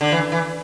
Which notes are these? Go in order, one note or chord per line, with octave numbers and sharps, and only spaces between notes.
D3
E3
E3